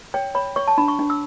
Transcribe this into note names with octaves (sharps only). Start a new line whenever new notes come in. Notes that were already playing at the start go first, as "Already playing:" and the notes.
C#5 G5
C#5 B5
C#5 C#6
A5
D4 B5
C#6
D4
E6